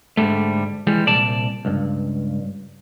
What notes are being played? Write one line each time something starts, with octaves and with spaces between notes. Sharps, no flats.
G#2 B2 D3 G3 A3
E3 G3 G#3
C2 A#2 D5 A5
C#2 G2